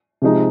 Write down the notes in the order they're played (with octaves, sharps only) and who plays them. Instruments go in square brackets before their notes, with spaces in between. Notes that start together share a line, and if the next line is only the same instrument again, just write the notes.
[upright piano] C3 F3 G#3 D#4